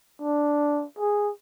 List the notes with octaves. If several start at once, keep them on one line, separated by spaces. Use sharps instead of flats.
D4
G#4